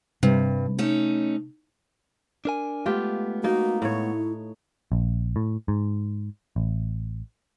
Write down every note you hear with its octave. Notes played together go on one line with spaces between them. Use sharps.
G2 C3
A3 C#4 D#4
D4 A#4 G#5
G#3 A3 B3 F4 G4
A#3 D#4 F#4
A2 E4 C#5
A#1
A2
G#2
A1